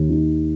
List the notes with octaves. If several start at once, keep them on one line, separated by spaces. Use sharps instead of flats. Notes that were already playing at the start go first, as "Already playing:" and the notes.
Already playing: D#2
D#3